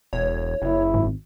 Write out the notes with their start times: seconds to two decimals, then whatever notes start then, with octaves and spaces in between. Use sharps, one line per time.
0.13 E1 C#5
0.62 F#1 E4
0.94 G#1